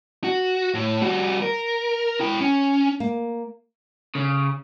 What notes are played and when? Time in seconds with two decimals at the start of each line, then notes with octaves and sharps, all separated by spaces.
0.24 F#4
0.74 A2
1.01 G3 F#4
1.42 A#4
2.20 E4 G5
2.41 C#4
3.00 A#3
4.15 C#3